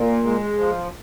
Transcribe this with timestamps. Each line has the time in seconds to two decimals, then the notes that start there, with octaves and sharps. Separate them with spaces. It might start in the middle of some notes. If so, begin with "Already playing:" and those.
Already playing: A#2
0.24 G#3
0.58 F3